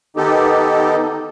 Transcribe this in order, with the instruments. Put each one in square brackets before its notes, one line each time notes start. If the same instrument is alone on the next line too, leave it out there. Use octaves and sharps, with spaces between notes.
[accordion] D#3 B3 D#4 G4 A4